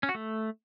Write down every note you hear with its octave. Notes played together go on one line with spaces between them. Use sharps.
C#4
F#4
A3